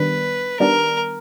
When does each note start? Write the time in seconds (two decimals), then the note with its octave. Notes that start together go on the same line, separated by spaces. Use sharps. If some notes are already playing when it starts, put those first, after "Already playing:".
Already playing: D#3 G3 B3 D4 B4
0.60 D#3 G3 B3 D4 A#4